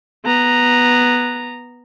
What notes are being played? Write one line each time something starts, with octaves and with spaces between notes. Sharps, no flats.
B3 A#5